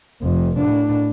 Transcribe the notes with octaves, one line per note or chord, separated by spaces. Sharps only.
F1 F2
A2 D4